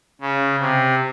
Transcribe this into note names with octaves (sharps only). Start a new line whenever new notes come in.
C#3
C3